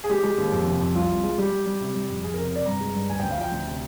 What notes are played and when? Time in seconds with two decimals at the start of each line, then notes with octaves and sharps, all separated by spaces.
0.04 G#4
0.09 G#3 G4
0.23 G#3
0.38 D#2
0.52 F2
0.67 C3
0.81 F2
0.95 C2 F4
1.09 C2
1.24 G#3
1.38 G3 G4
1.52 G3
1.66 G3
1.80 C3
1.95 G3
2.09 F2
2.23 F2 G#4
2.34 A#4
2.38 C3
2.45 A#4
2.52 C3 D5
2.66 G2 A#5
2.80 G#3
2.95 G2
3.09 D2 G#5
3.20 D2 G5
3.31 F5
3.38 F3 G5
3.52 D2
3.66 C3